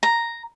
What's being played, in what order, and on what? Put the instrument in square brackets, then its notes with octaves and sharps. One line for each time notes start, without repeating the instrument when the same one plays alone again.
[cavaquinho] A#5